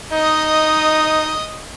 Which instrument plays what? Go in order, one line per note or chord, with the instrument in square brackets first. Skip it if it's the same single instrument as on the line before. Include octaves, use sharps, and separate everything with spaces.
[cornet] D#4 [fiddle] D#5 D#6